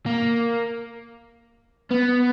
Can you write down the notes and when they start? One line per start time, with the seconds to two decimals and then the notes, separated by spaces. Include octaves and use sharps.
0.06 A#3
1.91 B3